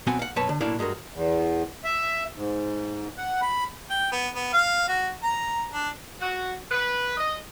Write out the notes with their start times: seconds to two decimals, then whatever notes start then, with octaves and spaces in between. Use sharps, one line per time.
0.07 B1 B3 C4 F#4 F#5 G#5
0.19 F5 F#5
0.36 B1 F#2 B4 C#5 A5
0.49 D3
0.61 B1 A2 A#3 D4 E4 F5
0.79 G2 G#3 F#4 A#4
1.14 E2
1.84 E5
2.35 G#2
3.17 F#5
3.42 B5
3.90 G5
4.12 B3
4.36 B3
4.53 F5
4.88 F#4
5.23 A#5
5.73 D4
6.20 F#4
6.71 B4
7.17 D#5